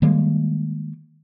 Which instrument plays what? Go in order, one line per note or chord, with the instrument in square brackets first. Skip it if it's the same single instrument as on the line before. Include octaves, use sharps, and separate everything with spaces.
[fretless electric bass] D#3 G3 G#3 A#3